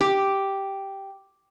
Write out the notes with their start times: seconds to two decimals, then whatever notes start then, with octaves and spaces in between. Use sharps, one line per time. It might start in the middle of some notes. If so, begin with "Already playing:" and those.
0.01 G4